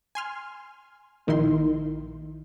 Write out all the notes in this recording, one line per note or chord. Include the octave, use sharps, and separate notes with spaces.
G#5 C6 F6
A#1 D#3 D#4 E4 C6